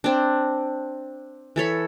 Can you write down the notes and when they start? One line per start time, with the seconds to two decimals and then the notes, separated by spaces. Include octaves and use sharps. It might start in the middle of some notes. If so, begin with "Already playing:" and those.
0.04 C4 D4
1.56 E3 A4 C#5 B5